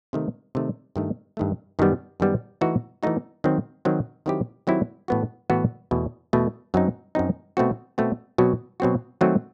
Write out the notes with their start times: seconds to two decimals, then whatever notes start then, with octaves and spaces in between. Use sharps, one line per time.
0.13 C3 D#3 A3
0.55 C3 D#3 A3
0.96 G2 D#3 A3
1.37 G2 D#3 A3
1.79 F#2 D#3 G3 B3
2.20 F#2 D#3 G3 B3
2.61 E3 A3 D#4 F#4
3.03 E3 A3 D#4 F#4
3.44 D#3 F#3 C4
3.85 D#3 F#3 C4
4.26 D#3 F#3 C4 E4 G4
4.67 D#3 F#3 C4 E4 G4
5.08 A2 E3 B3 F#4
5.50 A2 E3 B3 F#4
5.91 E2 B2 A3
6.33 E2 B2 A3
6.74 F#2 F#3 C4 D#4
7.15 F#2 F#3 C4 D#4
7.57 B2 A3 C4 F#4
7.98 B2 A3 C4 F#4
8.38 B2 F#3 C4 F#4
8.80 B2 F#3 C4 F#4
9.21 D#3 F#3 A3 C4 F#4